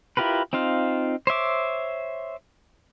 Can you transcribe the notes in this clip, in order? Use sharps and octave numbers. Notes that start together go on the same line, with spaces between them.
E4 F4 G4 A#4 B4
C4 D#4 F4 F5
C5 C#5 E5 D6